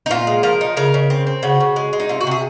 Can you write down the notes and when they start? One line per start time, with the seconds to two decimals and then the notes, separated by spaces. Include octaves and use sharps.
0.06 D#4
0.11 A#2 F4
0.27 G#3
0.43 F3 A#4
0.61 D#4
0.77 C#3 A#4
0.94 C#3
1.10 C4
1.27 C4
1.43 C#3 F#4
1.60 C#3
1.76 G#3
1.93 G#3
2.00 D#4
2.09 C3 F4
2.21 F#4
2.27 C3 G#4